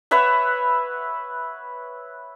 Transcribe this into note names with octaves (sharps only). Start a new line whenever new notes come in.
B4 C#5 E5 F#5